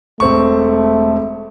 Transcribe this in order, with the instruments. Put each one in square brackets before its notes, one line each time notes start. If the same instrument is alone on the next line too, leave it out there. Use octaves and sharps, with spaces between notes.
[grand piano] E1 C4 C#6 [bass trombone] A3